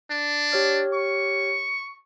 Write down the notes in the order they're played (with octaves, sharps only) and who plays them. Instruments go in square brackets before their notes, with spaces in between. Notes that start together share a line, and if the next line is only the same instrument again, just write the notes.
[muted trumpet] D4
[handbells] G4 C#5 F6
[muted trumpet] C#6